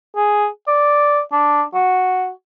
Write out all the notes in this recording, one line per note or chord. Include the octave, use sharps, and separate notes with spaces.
G#4
D5
D4
F#4